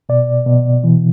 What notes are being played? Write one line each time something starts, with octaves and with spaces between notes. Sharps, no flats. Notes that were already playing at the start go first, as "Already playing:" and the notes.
B2 D5
B2
E3